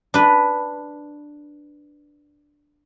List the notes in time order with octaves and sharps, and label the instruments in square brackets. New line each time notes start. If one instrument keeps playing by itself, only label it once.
[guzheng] D4 B4